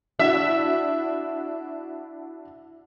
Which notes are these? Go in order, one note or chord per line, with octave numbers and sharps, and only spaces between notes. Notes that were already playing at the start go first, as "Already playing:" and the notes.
D4 E4 F#4 E5